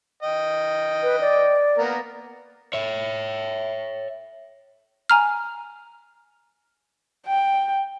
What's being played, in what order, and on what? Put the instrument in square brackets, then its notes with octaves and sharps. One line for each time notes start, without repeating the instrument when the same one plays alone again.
[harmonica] D#5 G5
[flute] B4
D5
[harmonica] A#3 B3 A#4
[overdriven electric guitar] C#5 E5
[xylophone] G#5 A#5 F6
[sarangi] G5